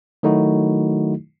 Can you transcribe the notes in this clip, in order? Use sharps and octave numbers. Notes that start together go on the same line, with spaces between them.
D#3 F#3 A3 D#4 E4 F#4